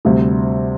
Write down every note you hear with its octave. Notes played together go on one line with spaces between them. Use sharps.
D2 C3 G3